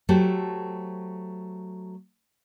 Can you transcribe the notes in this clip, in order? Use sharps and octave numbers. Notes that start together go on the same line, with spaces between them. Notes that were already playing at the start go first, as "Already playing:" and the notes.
F#3 A3 G4 A4 C5